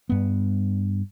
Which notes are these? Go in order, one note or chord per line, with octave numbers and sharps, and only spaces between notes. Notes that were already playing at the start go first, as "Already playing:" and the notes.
G2 B3